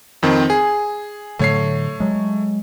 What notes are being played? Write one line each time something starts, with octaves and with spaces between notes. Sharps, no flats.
F2 D#3 C4
G#4
A2 D3 F#3 A3 C#5 C7
F#3 G#3